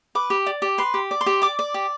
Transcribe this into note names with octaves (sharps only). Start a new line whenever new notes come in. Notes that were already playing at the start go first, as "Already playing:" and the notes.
B4 D6
G4
D5
G4
B4 C6
G4
D5
C6
G4
D5 D6
D5
G4